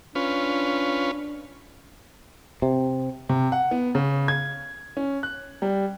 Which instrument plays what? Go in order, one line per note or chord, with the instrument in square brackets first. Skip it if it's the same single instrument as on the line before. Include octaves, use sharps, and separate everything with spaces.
[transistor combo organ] C#4 F4 B4 [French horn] D4
[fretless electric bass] C3
[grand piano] C3
F#5
B3
C#3
G#6
C#4
F#6
G3